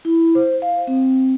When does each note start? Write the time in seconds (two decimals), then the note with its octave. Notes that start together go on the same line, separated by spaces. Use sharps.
0.05 E4
0.35 C5
0.62 F5
0.87 C4